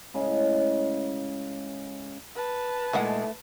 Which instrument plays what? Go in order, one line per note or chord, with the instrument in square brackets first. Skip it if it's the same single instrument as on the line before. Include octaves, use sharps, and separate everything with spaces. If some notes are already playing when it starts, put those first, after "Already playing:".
[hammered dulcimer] A2 C#3 G#3
[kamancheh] B4 A5
[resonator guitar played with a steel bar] A#2 G#3 E5 [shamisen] D#3 E3 F#5 [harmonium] A3